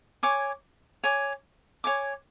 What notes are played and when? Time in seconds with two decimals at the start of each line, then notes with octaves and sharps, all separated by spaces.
0.23 C#5 G#5 D6
1.04 C#5 G#5 D6
1.84 C#5 G#5 D6